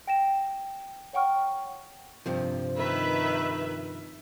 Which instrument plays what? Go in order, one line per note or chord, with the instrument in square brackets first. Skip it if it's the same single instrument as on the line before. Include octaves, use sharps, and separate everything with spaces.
[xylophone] G5 A#6 E7
C#5 F#5 G5 C#6 F6
[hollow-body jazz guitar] G2 C3 F3
[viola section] D#3 B4 E5